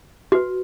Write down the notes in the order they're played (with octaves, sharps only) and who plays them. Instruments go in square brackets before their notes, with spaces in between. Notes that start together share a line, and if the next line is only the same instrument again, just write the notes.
[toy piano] F#4 B4